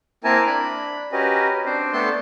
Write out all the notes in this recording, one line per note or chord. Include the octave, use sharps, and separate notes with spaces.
A#3 C4 E4 A#4 G#5 A5
D4 B5
C#4 F#4 G4 A#4 B4 D#5
C4 D4 C5
A3 B3 D4 A4 A5 C6